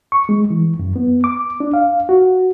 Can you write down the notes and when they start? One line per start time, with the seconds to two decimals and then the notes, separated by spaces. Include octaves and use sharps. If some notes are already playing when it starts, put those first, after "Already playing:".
0.12 C#6
0.29 G#3
0.50 E3
0.79 F#2
0.96 B3
1.24 D6
1.60 D4
1.74 F5
2.09 F#4